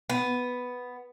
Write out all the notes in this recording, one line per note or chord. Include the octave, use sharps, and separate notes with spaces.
B3